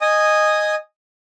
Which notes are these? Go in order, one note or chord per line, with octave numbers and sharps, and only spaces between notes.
D#5 G#5 D#6